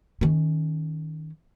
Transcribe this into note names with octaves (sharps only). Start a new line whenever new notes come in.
D#3 C#4